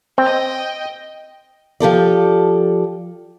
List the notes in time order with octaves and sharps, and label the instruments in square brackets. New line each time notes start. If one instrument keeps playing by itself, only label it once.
[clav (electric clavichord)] C4 [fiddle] D#5 G5
[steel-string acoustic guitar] F3 G4 A4 D5